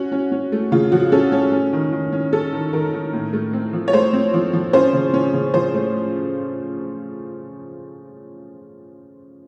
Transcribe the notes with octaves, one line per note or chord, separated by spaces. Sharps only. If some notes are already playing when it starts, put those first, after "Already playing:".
Already playing: C#4 F#4
C#4
C#4
A3
C#3 F4
F3 F#4
C#4 A4
C#4
C#4
D#3
D#3
C#4
C#4 A4
D#3
D#3 A#4
D#3
A2
A3
C4
F3
C#5
A3 C5
C4
F3
F3
C#4 C5
C#3
C#4
C#3
F3 C5
A3